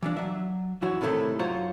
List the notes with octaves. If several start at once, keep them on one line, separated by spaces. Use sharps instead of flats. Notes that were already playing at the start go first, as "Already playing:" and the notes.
E3 F3 D4
F#3 E5
F#2 E3 E4 F#4 C#5
A2 C3 D#3 A3 E4 A4
F#2 F4 C5 C#5 A#5